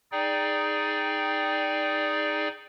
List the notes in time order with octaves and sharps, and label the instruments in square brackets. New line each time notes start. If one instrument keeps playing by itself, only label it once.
[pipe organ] D#4 G#4 D5 G5